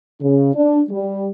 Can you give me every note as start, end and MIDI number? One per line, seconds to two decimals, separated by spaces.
0.21 0.51 49
0.54 0.81 62
0.90 1.28 55